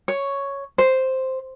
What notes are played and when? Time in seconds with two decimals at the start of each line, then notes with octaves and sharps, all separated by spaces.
0.08 C#5
0.78 C5